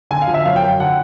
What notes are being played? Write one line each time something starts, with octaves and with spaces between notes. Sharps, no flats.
D3 G#5
F5
F3
E5
F#2 F5
G5
F#2
D3 F#5